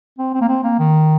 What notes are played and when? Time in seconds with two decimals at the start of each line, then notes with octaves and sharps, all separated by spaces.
0.19 C4
0.34 C4
0.41 A#3
0.49 C4
0.64 A#3
0.79 D#3